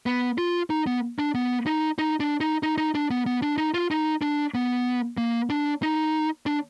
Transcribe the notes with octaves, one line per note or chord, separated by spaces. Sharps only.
B3
F4
D#4
B3
D4
B3
D#4
D#4
D4
D#4
D#4
D#4
D4
B3
B3
D4
D#4
F4
D#4
D4
B3
A#3
D4
D#4
D4